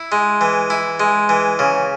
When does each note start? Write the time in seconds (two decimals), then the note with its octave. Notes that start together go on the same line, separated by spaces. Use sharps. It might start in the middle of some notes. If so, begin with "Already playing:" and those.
Already playing: E4
0.12 G#3
0.41 E3
0.70 E4
1.00 G#3
1.29 E3
1.59 C#3